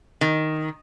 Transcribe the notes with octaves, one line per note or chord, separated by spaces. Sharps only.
D#3